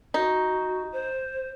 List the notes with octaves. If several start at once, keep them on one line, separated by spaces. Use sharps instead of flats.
D#4 F#4
C5